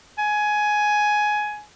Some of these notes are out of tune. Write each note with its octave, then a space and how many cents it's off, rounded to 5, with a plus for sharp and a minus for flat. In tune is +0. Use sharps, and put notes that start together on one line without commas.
G#5 +15